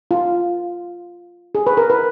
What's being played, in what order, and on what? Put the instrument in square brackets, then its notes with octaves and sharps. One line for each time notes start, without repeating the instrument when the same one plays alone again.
[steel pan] F4
G#4
B4
A#4
B4